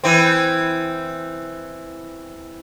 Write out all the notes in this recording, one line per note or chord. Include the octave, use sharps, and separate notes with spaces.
E3 C4